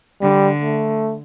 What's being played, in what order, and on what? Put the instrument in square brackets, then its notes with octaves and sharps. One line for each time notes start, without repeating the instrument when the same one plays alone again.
[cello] D3 [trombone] G3
[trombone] A3